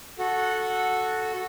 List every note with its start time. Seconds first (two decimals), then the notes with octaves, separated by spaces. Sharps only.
0.19 F#4 A4 F#5